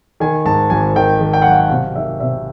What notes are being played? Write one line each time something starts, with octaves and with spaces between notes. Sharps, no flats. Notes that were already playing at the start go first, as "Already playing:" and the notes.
D#3 G#5
G#2 A5
G#1 G#5
D#3 G5
D#3
G5
F#3 F#5
F5
F#5
C3 F5
D#3 E5
C3 E5